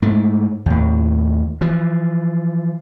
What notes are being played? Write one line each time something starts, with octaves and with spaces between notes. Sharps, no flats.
G#2 A3
D#2 A2
E3 F3